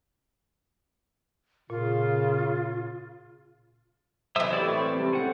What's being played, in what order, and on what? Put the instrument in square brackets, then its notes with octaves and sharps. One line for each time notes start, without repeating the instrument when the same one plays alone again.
[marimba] A#2 [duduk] C#3 [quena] F4
[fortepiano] B1 [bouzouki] E3 C5 [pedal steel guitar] E5 D#6 E6
[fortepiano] A3 G4 [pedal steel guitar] E4 D5
[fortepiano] A2 [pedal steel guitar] C4 D5 C#6
[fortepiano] C3 G3
[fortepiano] A3 C4 [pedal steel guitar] C#4 F#5